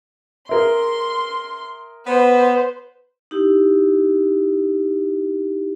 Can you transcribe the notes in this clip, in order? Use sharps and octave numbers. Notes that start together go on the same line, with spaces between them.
G#4 A#4 E5 C6
B3 B4 C5
D#4 E4 G4